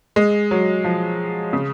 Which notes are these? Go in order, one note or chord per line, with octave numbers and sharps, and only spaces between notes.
G#3
F#3
F3
C#3